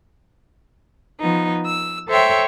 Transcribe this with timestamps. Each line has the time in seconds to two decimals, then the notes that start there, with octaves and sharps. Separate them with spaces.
1.22 F3 B3 D#4
1.67 E6
2.08 A4 C5 C#5 E5 G5